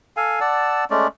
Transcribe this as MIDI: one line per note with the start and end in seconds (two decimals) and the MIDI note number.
0.17 0.40 69
0.17 0.40 77
0.17 0.40 80
0.41 0.85 74
0.41 0.85 78
0.41 0.85 81
0.41 0.85 88
0.90 1.07 56
0.90 1.07 57
0.90 1.07 61
0.90 1.07 74